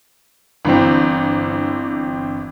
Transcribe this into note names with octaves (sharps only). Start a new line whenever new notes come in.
G1 E3 C4